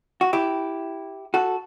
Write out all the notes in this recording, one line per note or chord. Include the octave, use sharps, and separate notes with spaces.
F#4
E4 G4
F#4 A4